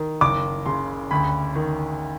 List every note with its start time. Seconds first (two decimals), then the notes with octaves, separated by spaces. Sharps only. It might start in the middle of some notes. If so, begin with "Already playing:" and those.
Already playing: D#3
0.21 F#1 D6
0.66 C#3 C6
1.11 D2 B5
1.55 D#3